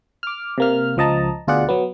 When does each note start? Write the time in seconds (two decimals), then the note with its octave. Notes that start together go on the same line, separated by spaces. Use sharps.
0.23 D6 F6
0.58 C3 A#3 F6
0.97 C#2 F3 D#5 A5 A#5
1.47 D2 B2 F4 G#4 D5 F#5
1.69 F#3 B3